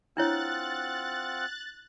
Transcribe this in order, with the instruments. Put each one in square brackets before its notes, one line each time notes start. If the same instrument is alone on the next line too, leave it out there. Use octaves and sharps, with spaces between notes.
[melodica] C4 F4 F#5 [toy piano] D4 E4 C#5 [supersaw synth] F#6 A6